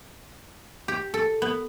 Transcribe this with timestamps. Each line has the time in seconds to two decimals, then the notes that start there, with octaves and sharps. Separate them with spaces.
0.88 G4
1.14 A4
1.42 B3